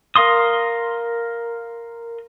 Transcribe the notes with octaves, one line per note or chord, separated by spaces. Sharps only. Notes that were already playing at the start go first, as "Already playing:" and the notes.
A#4 F5 C6 D#6